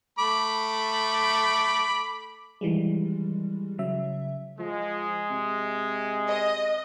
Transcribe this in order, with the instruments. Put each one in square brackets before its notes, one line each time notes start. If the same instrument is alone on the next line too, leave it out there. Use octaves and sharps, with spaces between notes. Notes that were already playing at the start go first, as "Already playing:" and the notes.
[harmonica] A3 B5 D6
[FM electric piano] D#3 E3 G3 G#3
C#3 F#3 E5
[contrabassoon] F3 [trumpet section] G#3
[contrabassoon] C3
[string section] D#5